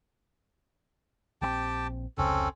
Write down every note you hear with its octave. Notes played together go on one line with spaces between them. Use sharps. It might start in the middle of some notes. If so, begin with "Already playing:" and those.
A#1 F3 C4 G4 G5 A5
F1 C#2 C#3 C4 C#4 A4